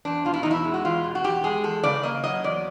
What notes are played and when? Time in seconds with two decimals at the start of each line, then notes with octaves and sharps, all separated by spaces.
0.05 E2 D4
0.25 B2 F4
0.34 E4
0.43 E2 D#4
0.51 E4
0.64 G#3
0.74 F#4
0.85 E2 F4
1.04 B2
1.15 F#4
1.24 E2 G4
1.44 G#3 G#4
1.64 E2 A4
1.83 C#3 D5
2.03 A#3 D#5
2.24 F#3 D#5
2.44 E2 D5